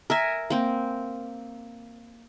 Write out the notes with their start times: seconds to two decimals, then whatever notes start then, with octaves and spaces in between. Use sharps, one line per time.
0.10 A#4 E5 G#5
0.50 A#3 C4